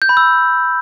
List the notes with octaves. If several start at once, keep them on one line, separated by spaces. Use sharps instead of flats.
G6
B5
E6